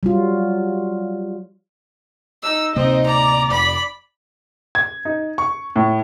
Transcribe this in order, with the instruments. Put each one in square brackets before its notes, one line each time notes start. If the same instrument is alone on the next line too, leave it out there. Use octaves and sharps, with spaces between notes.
[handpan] F#3 G3 F4
[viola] D#4 [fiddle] E6
[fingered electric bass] D1 C3 A#3 [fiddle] C4 [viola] D#4 D#5
[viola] D5 [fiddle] A#5
[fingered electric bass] F1 [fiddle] B5
[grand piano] G#6
D#4
C#6
A2